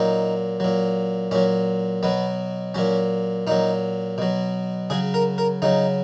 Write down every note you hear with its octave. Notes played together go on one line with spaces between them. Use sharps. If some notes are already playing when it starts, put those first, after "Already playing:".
Already playing: A#2 F#3 D#4
A#2 F#3
A#2 F#3 C#4
B2 F#3 B3
A#2 F#3 C#4
A#2 F#3 D#4
B2 F#3
C#3 F#3 G#4
A#4
A#4
C#3 F#3 D#4